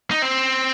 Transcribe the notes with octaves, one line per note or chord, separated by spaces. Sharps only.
D#4
C4